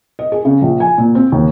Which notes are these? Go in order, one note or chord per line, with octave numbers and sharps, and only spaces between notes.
D#5
G#4
C#3
A#1
G#5
A#2
C4
D#2